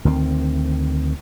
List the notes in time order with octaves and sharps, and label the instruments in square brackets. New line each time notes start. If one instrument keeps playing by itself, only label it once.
[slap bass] D2 D#3 F3 C4